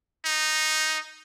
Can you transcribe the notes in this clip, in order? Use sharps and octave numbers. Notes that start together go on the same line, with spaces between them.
D#4